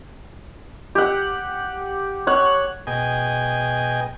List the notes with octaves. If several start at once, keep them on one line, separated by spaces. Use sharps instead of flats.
G4 F#5
C#5 F#5
B2 G#4 D#5 G5 G#5